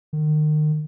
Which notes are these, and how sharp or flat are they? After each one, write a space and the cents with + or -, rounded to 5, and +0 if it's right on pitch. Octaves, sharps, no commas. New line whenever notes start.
D#3 -35